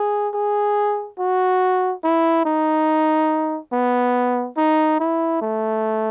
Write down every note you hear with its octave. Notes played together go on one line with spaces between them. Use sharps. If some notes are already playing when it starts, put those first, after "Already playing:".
Already playing: G#4
G#4
F#4
E4
D#4
B3
D#4
E4
A3